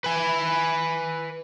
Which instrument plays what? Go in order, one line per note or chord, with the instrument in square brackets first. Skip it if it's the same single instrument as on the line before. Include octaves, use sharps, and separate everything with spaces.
[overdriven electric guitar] B4 G#5